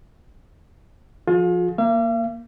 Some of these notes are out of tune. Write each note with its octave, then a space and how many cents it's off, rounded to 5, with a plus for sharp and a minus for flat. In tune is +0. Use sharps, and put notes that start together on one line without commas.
F3 +0 F4 +35 G#4 +35
A#3 +0 F5 -45